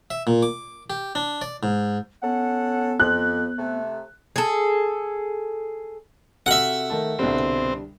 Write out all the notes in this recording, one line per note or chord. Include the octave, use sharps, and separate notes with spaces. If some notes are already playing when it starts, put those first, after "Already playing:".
E5
A#2
D6
G4
D4
D5
G#2
B3 C#4 A4 F#5
F2 F#6
C3 A3
G#4 A4
C3 F#4 A4 E5 F#5 F6
D#3 A3 A5
C2 B2 D3 G3 C4 D4